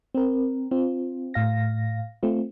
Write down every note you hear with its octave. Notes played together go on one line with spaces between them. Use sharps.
C4 A#4
C4 F4
A2 F5 A#6
A3 C4 F4